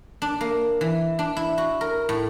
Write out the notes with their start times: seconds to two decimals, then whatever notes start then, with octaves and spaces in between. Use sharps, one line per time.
0.22 D4
0.41 A#3
0.81 E3
1.19 D4
1.37 E4
1.58 F#4
1.81 A#4
2.09 A2